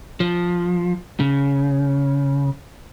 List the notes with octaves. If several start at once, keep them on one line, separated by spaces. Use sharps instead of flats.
F3
C#3